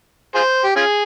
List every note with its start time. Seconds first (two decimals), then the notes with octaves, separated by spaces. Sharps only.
0.35 F4 G#4 C5
0.64 G4
0.76 C#4 F4 G#4